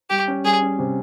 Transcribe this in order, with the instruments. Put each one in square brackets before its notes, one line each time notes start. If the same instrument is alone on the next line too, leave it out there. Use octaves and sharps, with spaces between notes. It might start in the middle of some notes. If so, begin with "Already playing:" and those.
[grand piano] G3 [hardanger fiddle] G4
[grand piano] C#4
[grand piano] G3 [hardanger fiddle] G#4
[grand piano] C#4
C3